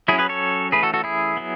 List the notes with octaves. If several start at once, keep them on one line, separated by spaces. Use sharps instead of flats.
F#3 C#4 E4 G#4
G#4 B4
A4 C#5
E3 A3 C#4 G#4 B4
F#4 A4
F#4 A4
E4 G#4
F#3 B3